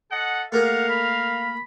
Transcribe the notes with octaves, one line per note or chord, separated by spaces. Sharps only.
A4 D#5 F#5
A3 A#3 G#4 A#4 F5 F#5
B5